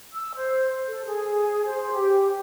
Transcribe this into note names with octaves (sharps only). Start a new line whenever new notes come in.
E6
C5
A4
G#4
C5
G4